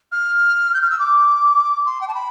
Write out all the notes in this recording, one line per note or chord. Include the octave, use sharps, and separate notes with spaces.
F6
G6
F6
E6
D6
C6
G5
A5
B5